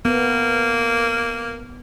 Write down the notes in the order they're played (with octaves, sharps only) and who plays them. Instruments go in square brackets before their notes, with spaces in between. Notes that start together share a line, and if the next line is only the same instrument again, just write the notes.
[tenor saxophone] A#3 [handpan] B3